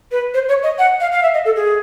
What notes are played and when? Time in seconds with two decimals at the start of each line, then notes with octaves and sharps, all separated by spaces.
0.12 B4
0.34 C5
0.48 C#5
0.63 D#5
0.79 F#5
1.00 F5
1.12 F5
1.23 E5
1.34 D#5
1.45 A4
1.56 G#4